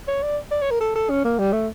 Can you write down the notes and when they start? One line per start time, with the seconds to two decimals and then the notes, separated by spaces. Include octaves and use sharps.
0.08 C#5
0.23 D5
0.51 D5
0.61 C#5
0.71 A#4
0.81 A4
0.96 A4
1.10 C#4
1.25 A#3
1.39 G3
1.53 A3